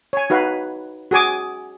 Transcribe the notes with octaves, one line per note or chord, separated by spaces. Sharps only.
C#5 G#5
D#4 F#4 B4 F5
F#4 G#4 G#5 D6